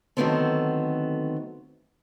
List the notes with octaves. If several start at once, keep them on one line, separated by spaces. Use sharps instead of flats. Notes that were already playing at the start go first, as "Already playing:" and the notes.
D3 D#3 F#3 A3 B3 C4